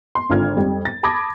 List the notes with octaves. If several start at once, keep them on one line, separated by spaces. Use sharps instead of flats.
C6
G#1 D3 F4 F6 G#6
F2 G3
A6
A5 B5 D6 D#6 G#6 A#6